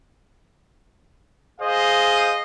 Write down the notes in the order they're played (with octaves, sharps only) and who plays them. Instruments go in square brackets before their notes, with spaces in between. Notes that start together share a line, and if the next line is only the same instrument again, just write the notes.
[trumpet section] G#4 C5 D#5 F5